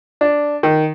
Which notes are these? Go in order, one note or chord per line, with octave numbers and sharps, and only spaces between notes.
D4
D#3